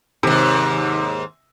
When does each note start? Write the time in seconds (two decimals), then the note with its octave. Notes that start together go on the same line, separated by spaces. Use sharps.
0.23 D#2 G#2 C3